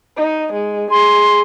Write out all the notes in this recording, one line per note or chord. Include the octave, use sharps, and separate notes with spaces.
D#4
G#3
G#4 C6